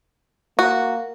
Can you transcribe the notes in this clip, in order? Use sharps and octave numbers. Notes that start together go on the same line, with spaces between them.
A#3 F#4